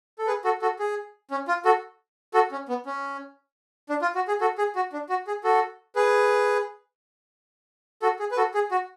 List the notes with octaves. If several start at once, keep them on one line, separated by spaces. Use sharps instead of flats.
A4
G#4 B4
F#4 A4
F#4 A4
G#4
C#4
F4
F#4 A4
F#4 A4
C#4
B3
C#4
D4
F4
F#4
G#4
F#4 A4
G#4
F#4
D4
F#4
G#4
F#4 A4
G#4 B4
F#4 A4
G#4
B4
F#4 A4
G#4
F#4